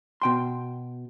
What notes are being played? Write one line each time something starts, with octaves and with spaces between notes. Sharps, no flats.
B2 G5 C6